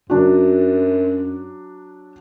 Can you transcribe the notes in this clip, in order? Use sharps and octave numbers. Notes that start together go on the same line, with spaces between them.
F#2 F#3 D4 F#4